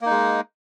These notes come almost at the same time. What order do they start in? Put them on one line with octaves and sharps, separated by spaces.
A#3 D#4 G#3